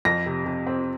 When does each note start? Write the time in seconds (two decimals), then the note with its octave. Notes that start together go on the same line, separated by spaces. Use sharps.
0.05 F2 A#6
0.26 C3
0.46 C3
0.67 C4